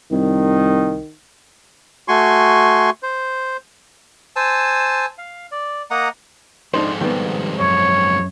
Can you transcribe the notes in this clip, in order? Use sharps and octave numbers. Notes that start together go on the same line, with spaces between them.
C2 D#3
A3 F#4 G#5 C6 C#6
C5
C5 G#5 A5 E6
F5
D5
A#3 D#5 F#5 A#5
F2 G#2 D4 D#4 C5
D#3 G3 B3
F#2 C#5